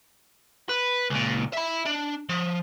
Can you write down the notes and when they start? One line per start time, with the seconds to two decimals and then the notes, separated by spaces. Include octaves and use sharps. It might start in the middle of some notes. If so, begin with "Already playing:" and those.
0.69 B4
1.10 C#2 A#2
1.53 E5 B5
1.86 D4
2.29 F3